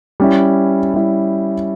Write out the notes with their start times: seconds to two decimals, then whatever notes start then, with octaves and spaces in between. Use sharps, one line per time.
0.20 G3 C#4 E4
0.94 G3 C#4 E4